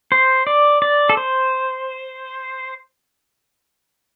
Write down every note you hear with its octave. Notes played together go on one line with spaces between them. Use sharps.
C5
D5
D5
A4
C5